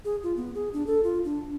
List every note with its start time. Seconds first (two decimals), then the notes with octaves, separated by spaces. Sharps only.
0.05 G#4
0.23 F4
0.36 B3
0.55 G#4
0.73 D4
0.87 A4
1.04 F4
1.25 D4